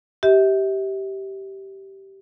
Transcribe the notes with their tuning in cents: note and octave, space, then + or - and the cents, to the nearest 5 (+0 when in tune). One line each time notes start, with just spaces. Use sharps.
G4 -15 E5 -35